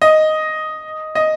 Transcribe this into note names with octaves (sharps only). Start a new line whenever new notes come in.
D#5
D#5